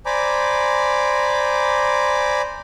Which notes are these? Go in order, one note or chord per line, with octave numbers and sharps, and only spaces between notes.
C5 D5 G#5 A#5 B5 D6